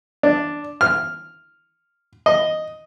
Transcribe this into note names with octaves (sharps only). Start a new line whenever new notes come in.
D4
F6
D#5